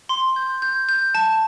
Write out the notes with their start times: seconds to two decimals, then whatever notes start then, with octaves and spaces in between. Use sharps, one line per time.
0.09 C6
0.36 G6
0.62 G6
0.89 G6
1.15 A5